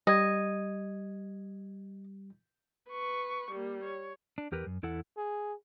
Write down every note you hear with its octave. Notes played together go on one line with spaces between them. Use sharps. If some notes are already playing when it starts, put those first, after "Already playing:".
G3 D#5 G#6
B4 C#6
G3 A#3
C#5
D4
E2 G4 A#4 B4
F#2
E2 E4 A4 F#5
G#4